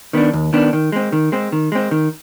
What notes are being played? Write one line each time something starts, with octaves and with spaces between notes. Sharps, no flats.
D#3 B3 D4
D#2
D#3 B3 D4
D#3
G#3 C4
D#3
G#3 C4
D#3
G#3 C4
D#3